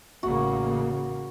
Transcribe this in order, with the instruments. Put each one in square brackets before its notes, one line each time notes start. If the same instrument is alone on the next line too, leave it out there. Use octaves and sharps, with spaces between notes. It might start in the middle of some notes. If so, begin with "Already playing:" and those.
[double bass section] A1 C#3 A#3 [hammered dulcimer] F#4